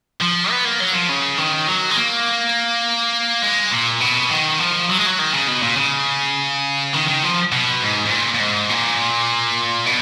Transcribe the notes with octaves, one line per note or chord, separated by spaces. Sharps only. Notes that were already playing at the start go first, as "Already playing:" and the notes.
F3
B3
A#3
F#3
F3
C#3
D#3
F#3
G#3
A#3
G#3
A#2
B2
D#3
F3
F#3
G#3
F#3
D#3
C#3
B2
A#2
C#3
D#3
D#3
F3
B2
G#2
G#2
A#2
A#2
G#2
A#2
B2